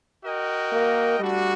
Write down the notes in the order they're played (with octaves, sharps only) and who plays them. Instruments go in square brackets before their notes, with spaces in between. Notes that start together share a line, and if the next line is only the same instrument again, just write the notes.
[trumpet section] F#4 A#4 D#5 G5
[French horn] A#3
[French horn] G3 [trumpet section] A3 D4 F#4